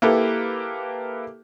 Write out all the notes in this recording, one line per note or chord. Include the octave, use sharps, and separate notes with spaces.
A#3 E4 G4 A4 B4